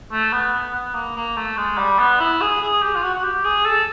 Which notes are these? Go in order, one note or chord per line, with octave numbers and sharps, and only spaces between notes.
A3
B3
B3
B3
A#3
A#3
A3
G#3
G3
B3
E4
G#4
G#4
G4
F4
F#4
F#4
G4
G#4
A4